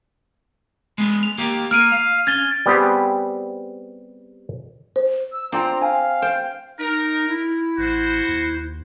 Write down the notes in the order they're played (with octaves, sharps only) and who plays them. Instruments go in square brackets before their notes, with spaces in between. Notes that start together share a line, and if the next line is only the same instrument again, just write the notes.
[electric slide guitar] G#3 B3
[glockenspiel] F7
[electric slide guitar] A#3 G4
[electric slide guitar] A#3 [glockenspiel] F6 D7 D#7
[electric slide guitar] F5
[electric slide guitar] C#4 [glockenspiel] G#6 A6 G7
[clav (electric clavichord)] G3 B3 C4 G4 G#4
[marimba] C5
[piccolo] E6
[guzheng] C4 [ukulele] D4 F4 G5 [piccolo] A#5
[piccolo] F5 [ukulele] G#5
[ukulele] C5 [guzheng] G5
[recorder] D#4 [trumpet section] A#4
[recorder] E4
[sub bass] A1 [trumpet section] F#4 C5
[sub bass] D#2